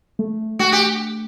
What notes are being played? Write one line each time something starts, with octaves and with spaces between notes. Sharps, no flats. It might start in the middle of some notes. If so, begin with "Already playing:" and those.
A3
A3 F#4
G4